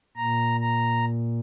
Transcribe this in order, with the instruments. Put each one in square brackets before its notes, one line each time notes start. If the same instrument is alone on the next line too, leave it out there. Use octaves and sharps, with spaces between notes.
[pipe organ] A#2 A#5
A#5